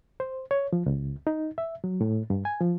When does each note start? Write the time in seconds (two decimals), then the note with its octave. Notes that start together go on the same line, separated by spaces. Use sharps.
0.20 C5
0.51 C#5
0.73 F3
0.86 C#2
1.27 D#4
1.58 E5
1.84 F#3
2.01 A2
2.30 G2
2.45 G#5
2.60 F3